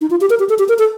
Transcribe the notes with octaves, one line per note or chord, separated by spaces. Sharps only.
D#4
F4
G4
A#4
G4
A4
G4
A#4
A4